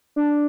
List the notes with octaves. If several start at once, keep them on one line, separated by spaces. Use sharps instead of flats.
D4